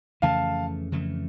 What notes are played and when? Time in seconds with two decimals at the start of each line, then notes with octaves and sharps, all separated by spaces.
0.22 F2 C#3 E3 A3 F5 A5
0.92 F2 C#3 E3 A3